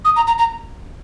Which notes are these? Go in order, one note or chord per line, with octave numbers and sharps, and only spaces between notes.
D#6
A#5
A#5
A#5